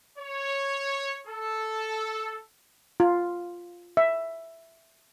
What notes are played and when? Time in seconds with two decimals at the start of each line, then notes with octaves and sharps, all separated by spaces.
0.18 C#5
1.27 A4
3.00 F4
3.97 E5